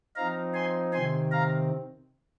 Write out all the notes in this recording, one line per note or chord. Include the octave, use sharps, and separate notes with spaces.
F3 C4 D#4 F5 A#5
G#5 C6
C3 D#3 C4 G#5 C6
F5 A#5